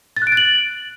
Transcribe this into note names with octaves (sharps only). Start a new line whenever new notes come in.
A6
F#6
D7
A6
F#7